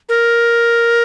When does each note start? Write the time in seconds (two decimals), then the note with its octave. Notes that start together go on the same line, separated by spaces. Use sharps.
0.09 A#4